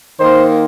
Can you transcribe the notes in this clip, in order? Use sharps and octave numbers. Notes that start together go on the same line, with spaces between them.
D#3 A#3 C5